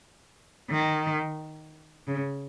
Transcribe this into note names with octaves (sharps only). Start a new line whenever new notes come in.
D#3
C#3